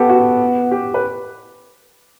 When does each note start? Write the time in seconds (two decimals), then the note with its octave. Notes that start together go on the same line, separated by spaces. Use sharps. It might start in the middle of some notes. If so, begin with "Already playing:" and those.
Already playing: B3 G4 A4
0.09 F#4
0.71 G4
0.94 B4